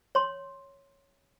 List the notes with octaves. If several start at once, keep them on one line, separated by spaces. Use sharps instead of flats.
C#5 C6